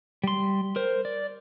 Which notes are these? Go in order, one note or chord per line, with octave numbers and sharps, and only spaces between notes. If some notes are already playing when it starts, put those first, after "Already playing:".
G3 C6
A#4 C5
D5